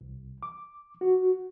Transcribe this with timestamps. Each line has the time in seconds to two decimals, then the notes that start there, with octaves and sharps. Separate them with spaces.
0.01 C2
0.43 D6
1.01 F#4